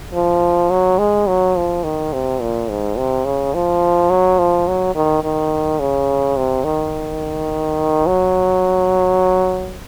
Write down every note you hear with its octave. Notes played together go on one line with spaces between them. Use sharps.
F3
F#3
G#3
F#3
F3
D#3
C3
A#2
G#2
C3
C#3
F3
F#3
F3
F#3
D#3
D#3
C#3
C3
D#3
F#3